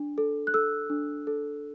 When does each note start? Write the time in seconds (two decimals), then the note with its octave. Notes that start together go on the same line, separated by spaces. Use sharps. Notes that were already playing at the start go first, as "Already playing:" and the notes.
Already playing: D4
0.18 A4
0.47 F#6
0.54 A4 E6
0.90 D4
1.27 A4